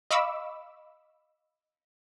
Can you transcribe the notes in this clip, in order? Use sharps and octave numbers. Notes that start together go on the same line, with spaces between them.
D#5 F5 B5 C#6 D6 E6